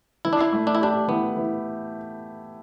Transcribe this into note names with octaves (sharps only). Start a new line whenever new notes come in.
E3 E4
D4
E4
A3
D4
E4
D4 G4
E3 B3
E3